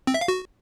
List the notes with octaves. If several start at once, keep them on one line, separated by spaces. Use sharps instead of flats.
C4
E5
F5
F#4